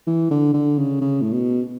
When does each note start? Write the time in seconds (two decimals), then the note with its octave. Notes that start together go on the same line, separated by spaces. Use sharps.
0.07 E3
0.31 D3
0.54 D3
0.78 C#3
1.01 C#3
1.21 A2
1.33 B2